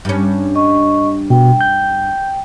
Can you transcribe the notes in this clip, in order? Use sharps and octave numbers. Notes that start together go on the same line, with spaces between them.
G2 C#4
D#5 C#6
B2 G5
G6